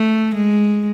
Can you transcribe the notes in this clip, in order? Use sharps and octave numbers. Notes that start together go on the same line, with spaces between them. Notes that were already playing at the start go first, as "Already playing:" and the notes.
Already playing: A3
G#3